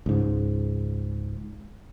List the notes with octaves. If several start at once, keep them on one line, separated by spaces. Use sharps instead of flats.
C#2 G#2